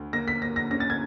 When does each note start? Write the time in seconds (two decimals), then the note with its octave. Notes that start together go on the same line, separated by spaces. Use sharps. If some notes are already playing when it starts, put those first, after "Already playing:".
Already playing: D2
0.13 A#3 A#6
0.28 B6
0.42 A#3 A#6
0.56 A#6
0.70 C#4 A#6
0.80 A6
0.90 G#6